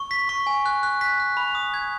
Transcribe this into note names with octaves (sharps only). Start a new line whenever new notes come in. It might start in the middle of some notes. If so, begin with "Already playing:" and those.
Already playing: C#6
B6
C#6
G#5
F#6
F#6
B6
F#6
B5
D#6
G#6